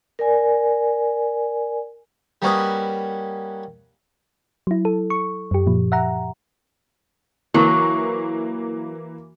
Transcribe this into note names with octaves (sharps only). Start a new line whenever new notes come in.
A#4 D5 G#5
G3 A#3 C#4 F#4 B4 D#5
F#3 E4
A4
C#6
F#2 G4
A#2 F3
E5 F#5 A#5
E3 F#3 A#3